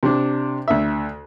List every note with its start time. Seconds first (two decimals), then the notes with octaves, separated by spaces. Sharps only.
0.03 C3 D4
0.68 D2 E5